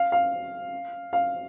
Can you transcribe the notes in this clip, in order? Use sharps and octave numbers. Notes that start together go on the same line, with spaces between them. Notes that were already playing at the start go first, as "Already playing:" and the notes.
Already playing: F5
F5
F5